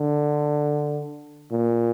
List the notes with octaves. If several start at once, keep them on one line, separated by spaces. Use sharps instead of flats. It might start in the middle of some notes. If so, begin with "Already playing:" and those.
Already playing: D3
A#2